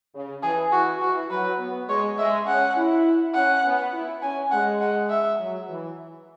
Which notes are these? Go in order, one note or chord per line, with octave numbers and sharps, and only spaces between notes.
C#3
E3 G#4
E3 F#4
E3 F#4
F#3 B4
B3
G#3 C#5
G#3 E5
C#4 F#5
E4
C#4 F#5
B3
E4
C#4 G#5
G#3 F#5
F#5
E5
F#3
E3